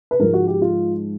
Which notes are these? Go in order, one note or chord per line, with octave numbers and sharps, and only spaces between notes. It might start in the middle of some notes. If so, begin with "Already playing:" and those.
B4
G#2 F3 G#3 A#4
F#4
G4
F4